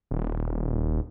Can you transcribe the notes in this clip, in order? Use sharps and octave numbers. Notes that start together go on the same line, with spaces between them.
D#1